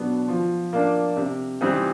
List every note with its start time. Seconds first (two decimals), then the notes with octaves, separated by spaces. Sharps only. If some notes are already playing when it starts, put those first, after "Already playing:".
Already playing: B2 F#3 B3 D4
0.28 F3
0.73 A#3 D4
1.17 C3
1.61 E3 G3 C4 D#4